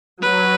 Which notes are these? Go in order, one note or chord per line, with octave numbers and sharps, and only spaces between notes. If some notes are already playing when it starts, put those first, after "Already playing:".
F#3 B4